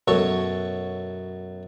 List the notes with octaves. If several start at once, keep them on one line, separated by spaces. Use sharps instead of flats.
F#2 B2 A4 C#5 C#6